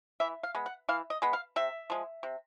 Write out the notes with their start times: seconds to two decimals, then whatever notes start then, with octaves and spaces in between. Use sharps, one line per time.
0.20 E3 E5
0.43 F5
0.55 G#3 B3
0.66 F#5
0.89 E3 F5
1.10 D#5
1.22 G#3 B3
1.33 F5
1.56 C3 E5
1.90 F3 G#3
2.23 C3